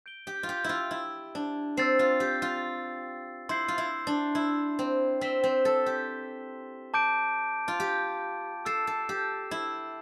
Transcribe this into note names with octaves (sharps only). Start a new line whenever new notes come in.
G6 D7 G7
G4
F4
G4
E4 F4
E4
D4
C4 E6 A6 C7
F4
G4
F4
E4 C6 G6 C7
F4
E4
D4
E4
C4
C4 E6 B6 E7 G7
C4
A4
G4
A5 D6 G6 D7
F4
G4
A4 E6 A6 C7 E7
A4
G4
E4